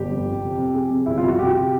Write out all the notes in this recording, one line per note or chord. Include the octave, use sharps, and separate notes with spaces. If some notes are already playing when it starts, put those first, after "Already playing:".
Already playing: G1 G4
F2
C3
F2
F2
C3 G#4
F2
G1 E4
F4
C3 F#4
C3 G4